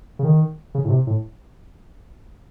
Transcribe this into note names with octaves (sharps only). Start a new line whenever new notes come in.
C#3
D#3
C#3
A2
C3
A2